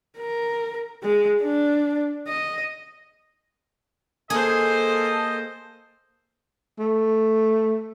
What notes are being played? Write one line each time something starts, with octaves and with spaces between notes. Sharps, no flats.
A#4
G#3
D4
D#5
A#3 G#4 A4 C5 D#5
A3